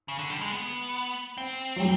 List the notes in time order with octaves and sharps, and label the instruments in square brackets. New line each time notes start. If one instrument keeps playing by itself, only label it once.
[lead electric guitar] C#3
D3
G3
G#3
B3
C4
[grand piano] F#3
G3